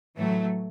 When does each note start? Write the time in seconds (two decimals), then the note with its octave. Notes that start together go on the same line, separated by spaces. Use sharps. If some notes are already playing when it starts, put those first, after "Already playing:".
0.17 A2 E3 F#3 A3